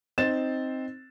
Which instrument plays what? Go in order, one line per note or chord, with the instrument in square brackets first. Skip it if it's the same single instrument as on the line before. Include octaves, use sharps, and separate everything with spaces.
[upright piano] C4 D#4 C5 A6 E7